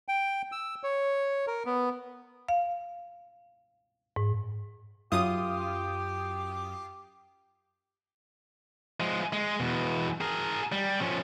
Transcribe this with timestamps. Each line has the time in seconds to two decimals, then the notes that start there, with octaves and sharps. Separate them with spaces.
0.08 G5
0.52 E6
0.84 C#5
1.47 A#4
1.66 B3
2.48 F5
4.16 G#2
5.12 F#2 F4 G4 D#6
9.00 F3 G#3
9.33 G#3
9.60 E2 B2
10.21 G#4 A#4
10.72 G3
11.01 F3 C#4